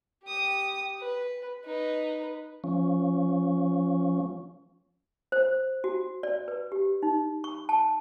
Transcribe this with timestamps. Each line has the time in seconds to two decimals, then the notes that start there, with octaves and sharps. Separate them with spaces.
0.23 G4 D#6
0.99 B4
1.65 D#4 B4
2.64 F3 C#4
5.32 C5
5.84 F#4
6.23 D5
6.48 B4
6.72 G4
7.03 D#4
7.44 C#6
7.69 A5